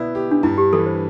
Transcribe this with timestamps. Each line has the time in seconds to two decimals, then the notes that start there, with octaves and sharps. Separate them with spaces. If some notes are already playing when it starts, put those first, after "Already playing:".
Already playing: B2 B3 E4 D5
0.15 G4
0.31 D4
0.43 G2 E4
0.58 G4
0.73 E3 A4
0.86 C5